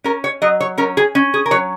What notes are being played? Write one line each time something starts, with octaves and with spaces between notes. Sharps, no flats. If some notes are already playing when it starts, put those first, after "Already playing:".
C#4 A#4
C#5
F#3 D#5
C#5
C#4 A#4
G#4
C#4
G#4
A#4
F#3 C#5